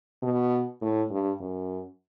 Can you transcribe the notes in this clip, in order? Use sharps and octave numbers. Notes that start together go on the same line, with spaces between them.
B2
A2
G2
F#2